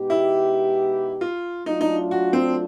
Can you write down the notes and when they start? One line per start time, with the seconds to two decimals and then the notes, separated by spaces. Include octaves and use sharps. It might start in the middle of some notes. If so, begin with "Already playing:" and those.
Already playing: B2 G#3 B3 D#4 G4
0.10 E4
1.21 F4
1.66 F#3 A3 D4 D#4 F4
1.81 D#4
2.11 F#4
2.33 C4